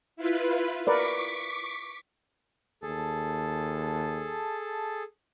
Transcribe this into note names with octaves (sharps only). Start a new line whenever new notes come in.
E4 F4 B4
A#4 B4 D5 C#6 D6 B6
D#2 G#4 A4 A5